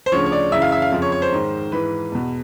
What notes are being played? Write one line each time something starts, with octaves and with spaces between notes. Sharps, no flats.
C5
D2 C#3 F3 C#5
C#5
D5
F#2 C#3 E3 E5
F5
E5
F5
F2 C#3 F3
C#5
C#5
C5
G#2 D#3
G#2 E3 B4
E2 B2